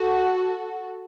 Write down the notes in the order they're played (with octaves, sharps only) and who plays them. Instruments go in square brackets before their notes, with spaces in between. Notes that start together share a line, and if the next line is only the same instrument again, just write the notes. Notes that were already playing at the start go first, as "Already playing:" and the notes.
Already playing: [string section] F#4 A4